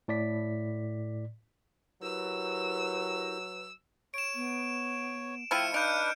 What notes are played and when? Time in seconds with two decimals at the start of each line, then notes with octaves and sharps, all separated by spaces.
0.08 A2 D5 B6
2.02 F#3 E4 G4 A#4 B4 E6
4.14 C#5 D7 E7
4.35 B3
5.51 F3 A3 E4 G5 F6 C#7 D#7
5.74 D4 D#4 B4 F5 G6 D7